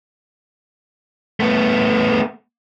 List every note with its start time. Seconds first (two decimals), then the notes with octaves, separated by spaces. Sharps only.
1.40 A3 B3